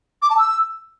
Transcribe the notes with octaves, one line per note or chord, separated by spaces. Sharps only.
D6
A5
E6